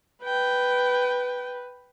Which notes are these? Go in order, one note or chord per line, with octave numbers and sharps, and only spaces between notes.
B4 G5